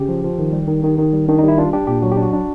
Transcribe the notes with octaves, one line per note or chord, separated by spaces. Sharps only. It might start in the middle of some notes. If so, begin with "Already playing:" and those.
Already playing: C#3 G4
F3
F3
D#3
G3
D#3
D#3
D#3
G3
D#3 D4
G3 D#4
E4
D4 F4
D4 G4
A#2 G4
F#3 F#4
G4
D4 F#4
D4